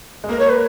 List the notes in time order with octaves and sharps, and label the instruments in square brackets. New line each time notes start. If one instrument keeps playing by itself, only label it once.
[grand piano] G#3
[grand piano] A#3 [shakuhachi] A#4
[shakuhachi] C#5
B4